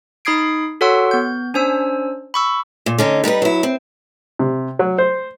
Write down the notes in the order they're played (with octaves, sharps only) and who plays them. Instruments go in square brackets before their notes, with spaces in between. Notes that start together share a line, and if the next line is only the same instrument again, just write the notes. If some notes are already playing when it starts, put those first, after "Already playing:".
[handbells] D#4 B5 D#6 G#6 C7 D7
F#4 A4 C#5 F#5 C6 E6
B3 G6
C#4 D4 C5 G#5 E6
B5 C#6 E6
[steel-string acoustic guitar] A#2
D3 C#4 D#4
G3 D#4 A#4 B4
F#3 E4
C4
[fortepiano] C3
F#3
C5